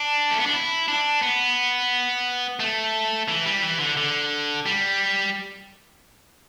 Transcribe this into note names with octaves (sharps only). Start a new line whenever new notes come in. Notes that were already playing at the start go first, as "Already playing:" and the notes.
Already playing: D4
A3
B3
D4
E4
D4
B3
A3
E3
G3
E3
D3
D3
G3